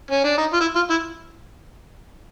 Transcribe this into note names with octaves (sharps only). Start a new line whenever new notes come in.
C#4
D4
D#4
F4
E4
F4
E4